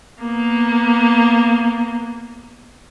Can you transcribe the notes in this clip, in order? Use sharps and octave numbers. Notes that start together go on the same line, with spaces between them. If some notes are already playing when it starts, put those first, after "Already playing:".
A#3 B3